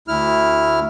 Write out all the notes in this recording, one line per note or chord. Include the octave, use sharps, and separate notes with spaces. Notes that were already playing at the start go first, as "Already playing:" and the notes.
D2 E4 F6